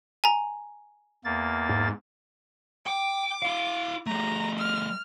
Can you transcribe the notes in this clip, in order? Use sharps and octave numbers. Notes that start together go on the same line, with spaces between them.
G#5 A#5
E2 A#3 A6
G#2
G5 D6
E4 F5
G3 A3 A#5
F6